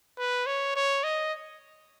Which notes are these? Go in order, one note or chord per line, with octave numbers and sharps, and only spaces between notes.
B4
C#5
C#5
D#5